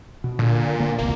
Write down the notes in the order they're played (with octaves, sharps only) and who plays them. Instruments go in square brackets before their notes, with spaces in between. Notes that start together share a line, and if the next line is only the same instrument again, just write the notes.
[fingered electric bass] B2
[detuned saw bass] A#2 [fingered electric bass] D3
[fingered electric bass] D3 A#3
[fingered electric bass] E1 C2 [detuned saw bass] A#3